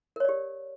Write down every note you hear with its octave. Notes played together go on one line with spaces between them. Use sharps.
G4 A#4 C#5 D5